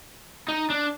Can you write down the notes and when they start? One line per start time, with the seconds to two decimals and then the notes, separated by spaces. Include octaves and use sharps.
0.48 D#4
0.70 D4